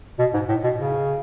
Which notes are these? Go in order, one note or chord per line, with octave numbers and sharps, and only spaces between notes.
B2
G#2
A2
B2
C#3